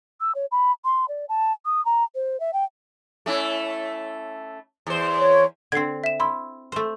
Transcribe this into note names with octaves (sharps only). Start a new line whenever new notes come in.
E6
C#5
B5
C6
D5
A5
D#6
A#5
C5
E5
G5
A3 C#4 E4
E2 C5
C#5
D3 C4 G#6 C7
E5 E7
E4 B5 C6 E6
A3 C5